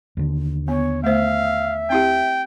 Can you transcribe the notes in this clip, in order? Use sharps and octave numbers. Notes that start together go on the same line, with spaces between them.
D#2 D3
B3 C#5
A3 C5 E5 F5
C4 E4 G4 G5